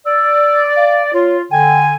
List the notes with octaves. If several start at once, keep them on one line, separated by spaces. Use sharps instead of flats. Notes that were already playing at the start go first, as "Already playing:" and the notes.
D5 E6
F5
F4 C#5
D3 G5 G#5